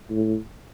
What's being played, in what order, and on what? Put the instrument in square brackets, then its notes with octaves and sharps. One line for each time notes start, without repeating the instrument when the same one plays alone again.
[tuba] A2